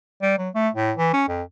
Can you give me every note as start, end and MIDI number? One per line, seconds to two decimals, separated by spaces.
0.22 0.38 55
0.38 0.50 54
0.55 0.69 57
0.74 0.92 45
0.97 1.11 52
1.14 1.26 61
1.29 1.43 41